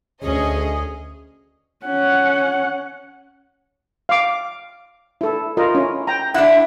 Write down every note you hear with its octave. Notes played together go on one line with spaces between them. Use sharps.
D2 C#4 G#4 D#5
C#4 F#5
F5 D6
E4 A4
F4 A#4 D#5
C#4 E4
G5 A#5
D4 E4 F#5